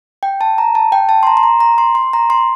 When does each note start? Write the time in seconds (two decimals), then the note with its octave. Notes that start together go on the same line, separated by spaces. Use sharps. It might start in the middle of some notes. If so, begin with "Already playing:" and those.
0.23 G5
0.41 A5
0.58 A#5
0.75 A5
0.92 G5
1.09 A5
1.23 C6
1.27 A#5
1.37 C6
1.43 A#5
1.60 A#5
1.78 C6
1.95 C6
2.13 A#5
2.30 C6